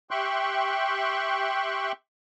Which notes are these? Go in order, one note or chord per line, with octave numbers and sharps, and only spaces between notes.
G4 E5 G5 C6 C#6 F#6